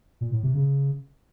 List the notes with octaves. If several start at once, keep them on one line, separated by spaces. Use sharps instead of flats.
A#2
A2
C3
C#3